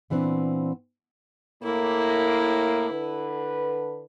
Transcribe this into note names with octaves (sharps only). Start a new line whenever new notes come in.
A#2 E3 B3 C4 D4
A2 A#3 E4
D3 B4